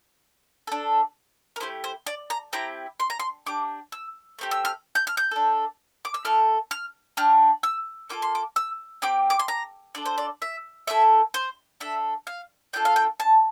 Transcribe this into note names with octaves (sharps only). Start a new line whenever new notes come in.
D4 A4
A#4
A3 E4 G4 C5
C5
D5
A#5
C4 E4 G4 A#5
C6
A#5
C6
D4 G4 D6
E6
A3 C4 G4
E6
F6
G6
F6
G6
D4 A4
D6
E6
A3 E4 A4 F6
F6
D4 G4 F6
E6
A#3 F4 A4 D6
C6
D6
E6
C4 G4 D6
D6
C6
A#5
D4 F4 A4 D5
C5
D5
E5
A3 E4 A4 E5
C5
D4 A4 E5
F5
D4 F4 A4 G5
F5
G5
A5